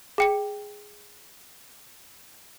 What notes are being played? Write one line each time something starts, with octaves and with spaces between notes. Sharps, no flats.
G#4 G5 C#7